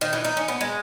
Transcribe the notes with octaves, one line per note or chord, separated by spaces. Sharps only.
D#3
E3
D#4
C#4
B3
G#3